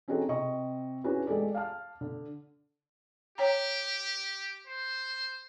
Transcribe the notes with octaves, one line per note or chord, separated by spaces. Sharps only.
C4 C#4 D#4 F#4 G#4 A4
C3 C4 D#5 C#6
C#4 D4 E4 F#4 G#4 B4
G#3 G4 A4 D5
F5 A5 F6
D3
G4 C#5 G5 A#5
C5